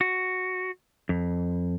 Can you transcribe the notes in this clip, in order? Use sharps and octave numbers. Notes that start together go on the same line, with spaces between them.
F#4
F2